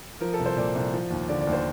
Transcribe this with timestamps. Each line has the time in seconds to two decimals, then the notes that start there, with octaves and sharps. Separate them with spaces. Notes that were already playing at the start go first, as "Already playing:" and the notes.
0.21 F3 A#4
0.34 A4
0.39 C2
0.46 C5
0.56 A#2 D5
0.75 C2
0.94 F3
1.11 D#2
1.29 D3 D5
1.41 D5
1.47 D#2
1.53 C5